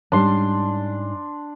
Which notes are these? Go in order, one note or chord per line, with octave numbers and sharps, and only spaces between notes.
G#2 G3 C#4 D4 C6